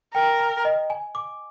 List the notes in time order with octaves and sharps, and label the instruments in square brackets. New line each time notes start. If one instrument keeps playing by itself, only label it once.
[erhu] A#4 [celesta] G5
[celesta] A#5
D#5
G#5
D6